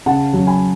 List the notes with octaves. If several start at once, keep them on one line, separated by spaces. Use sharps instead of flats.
C#3 F#5 A5
F#3
G#5 B5